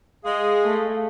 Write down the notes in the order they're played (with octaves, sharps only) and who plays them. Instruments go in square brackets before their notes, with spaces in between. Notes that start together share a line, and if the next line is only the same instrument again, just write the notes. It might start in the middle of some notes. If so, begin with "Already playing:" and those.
[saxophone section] G#3 G#4 [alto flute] F5
[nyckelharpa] A3